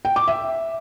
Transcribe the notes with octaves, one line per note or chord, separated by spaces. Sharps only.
G5
D6
E5